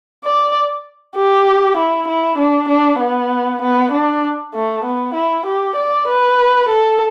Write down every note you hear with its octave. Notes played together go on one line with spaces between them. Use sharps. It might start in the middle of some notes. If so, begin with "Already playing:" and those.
D5
G4
E4
E4
D4
D4
B3
B3
D4
A3
B3
E4
G4
D5
B4
A4